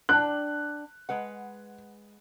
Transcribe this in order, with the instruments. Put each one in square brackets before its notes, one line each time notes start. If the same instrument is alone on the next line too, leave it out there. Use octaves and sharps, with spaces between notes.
[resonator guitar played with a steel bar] D4 D5 G5 [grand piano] F#6
[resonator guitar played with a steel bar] G#3 B4 F#5